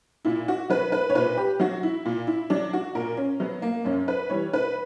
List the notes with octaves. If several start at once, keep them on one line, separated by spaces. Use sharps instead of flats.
A#2 E4
F#4
F#3 B4
B4
C#5
A#2 B4
G4
F#3 F#4
E4
A#2
E4
F#3 D4
F#4
A#2 A#4
C#4
F#3 B3
A#3
F#2 C#4
B4
E3 G3 C#5
B4